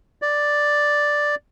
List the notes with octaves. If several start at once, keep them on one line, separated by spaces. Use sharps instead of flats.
D5